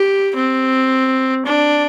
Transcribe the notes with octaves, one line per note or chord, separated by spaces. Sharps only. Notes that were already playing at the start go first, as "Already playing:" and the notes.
Already playing: G4
C4
D4